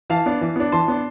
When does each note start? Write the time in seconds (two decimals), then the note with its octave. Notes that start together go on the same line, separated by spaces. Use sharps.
0.10 E3 F5 A5
0.26 B3 D4
0.41 E3
0.56 B3 D4
0.72 E3 A5 C6
0.88 B3 D4